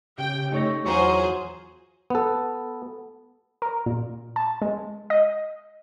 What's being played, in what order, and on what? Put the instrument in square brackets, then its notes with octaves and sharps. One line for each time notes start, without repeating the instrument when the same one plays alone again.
[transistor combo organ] C#3 G4 [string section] G5
[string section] A3 [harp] D#4 C#5 A#6
[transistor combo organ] E2 [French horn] F#3 [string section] F4 G#4 C5 [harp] F#5 A#5 C#6
[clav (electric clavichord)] B3 A4
[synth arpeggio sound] A#4
A#2
A5
G#3
D#5